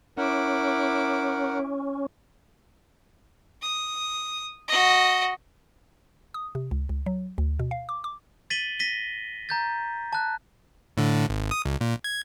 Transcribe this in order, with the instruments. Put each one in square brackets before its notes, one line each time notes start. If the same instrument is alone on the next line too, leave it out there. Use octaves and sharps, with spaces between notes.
[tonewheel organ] C#4 [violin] E4 D6 [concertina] A#4 F#5
[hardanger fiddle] D#6
F#4 D#5
[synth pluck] D#6
C3
C#2
C#2
F#3
D2
B2
F5
D6
D6
[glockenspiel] A6 B6 D#7 F#7 G7
A#6 B6 D#7 G7
A#5 G6 A6
A5 F#6
[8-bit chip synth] A2 D3
G#1
D#6
C#2
A#2
G#6